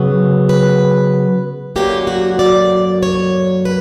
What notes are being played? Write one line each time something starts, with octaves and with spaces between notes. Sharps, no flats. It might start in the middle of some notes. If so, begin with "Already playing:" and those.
Already playing: C#3 F#3 B3
B4
F#2 D3 F#3 A#3 G4
F#4
D5
C#5
B4